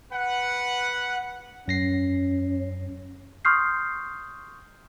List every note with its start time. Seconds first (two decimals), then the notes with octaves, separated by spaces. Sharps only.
0.11 B4 F#5
1.68 F#2 C#4 A#6 C7
3.45 C6 C#6 D#6 F6 G6 C7